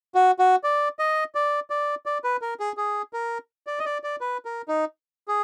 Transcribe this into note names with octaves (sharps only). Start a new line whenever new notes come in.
F#4
F#4
D5
D#5
D5
D5
D5
B4
A#4
G#4
G#4
A#4
D5
D#5
D5
D5
B4
A#4
D#4
G#4